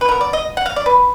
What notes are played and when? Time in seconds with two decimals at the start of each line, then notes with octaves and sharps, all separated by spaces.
0.01 B4
0.08 F3 B3 A#4
0.21 D5
0.33 D#5
0.57 F#5
0.66 F5
0.76 D5
0.86 B4